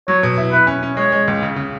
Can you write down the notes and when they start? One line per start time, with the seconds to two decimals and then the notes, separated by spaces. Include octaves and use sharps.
0.08 F#3 C#5
0.23 B2
0.38 E4
0.53 E4 B4
0.67 C#4
0.83 C#4
0.97 G#3 C#5
1.12 G#3
1.28 C#2
1.42 C#3
1.56 C#3